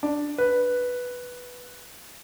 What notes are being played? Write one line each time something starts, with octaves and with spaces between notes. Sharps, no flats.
D4
B4